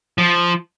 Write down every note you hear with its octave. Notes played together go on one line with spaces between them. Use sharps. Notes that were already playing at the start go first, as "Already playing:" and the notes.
F3